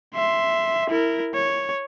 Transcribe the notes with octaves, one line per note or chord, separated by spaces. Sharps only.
E5 C6
E4 A#4
C#5